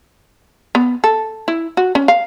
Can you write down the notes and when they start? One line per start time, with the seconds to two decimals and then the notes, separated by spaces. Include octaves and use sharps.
0.75 B3
1.04 A4
1.48 E4
1.77 F#4
1.95 C#4
2.08 F5